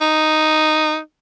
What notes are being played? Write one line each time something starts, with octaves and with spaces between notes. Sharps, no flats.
D#4